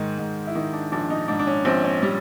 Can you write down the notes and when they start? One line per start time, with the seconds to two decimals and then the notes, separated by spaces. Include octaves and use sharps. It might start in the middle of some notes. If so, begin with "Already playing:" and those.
Already playing: G#2 D#3 G#3
0.18 G#2
0.47 E4
0.55 D#3 D#4
0.73 D4
0.92 A#1 D4
1.10 D#4
1.28 G#2 D4
1.39 D4
1.47 C#4
1.65 A#1 C4
1.84 C#4
2.03 G3